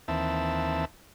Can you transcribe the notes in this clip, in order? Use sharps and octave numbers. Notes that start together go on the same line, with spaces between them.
D#2 E3 C4 E5 A5